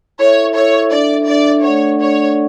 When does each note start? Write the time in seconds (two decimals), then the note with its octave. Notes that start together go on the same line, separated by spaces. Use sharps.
0.19 E4 A4 C#5 E5
0.55 E4 A4 C#5 E5
0.91 D4 A4 D5 E5
1.27 D4 A4 D5 E5
1.63 A3 D4 A4 C#5 D5 F#5
2.00 A3 D4 A4 C#5 D5 F#5